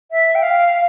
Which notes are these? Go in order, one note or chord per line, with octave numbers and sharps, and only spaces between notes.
E5
G5
F5